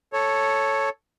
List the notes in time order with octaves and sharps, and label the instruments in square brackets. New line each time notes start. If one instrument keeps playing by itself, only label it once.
[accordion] A4 C#5